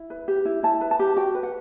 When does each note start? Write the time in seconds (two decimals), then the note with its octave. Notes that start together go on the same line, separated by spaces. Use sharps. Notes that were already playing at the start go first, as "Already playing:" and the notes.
Already playing: E4
0.10 B4
0.28 G4
0.45 E4
0.63 E4 A5
0.81 B4
0.91 A5
0.99 G4
1.16 F#4 G5
1.35 B4
1.43 F#5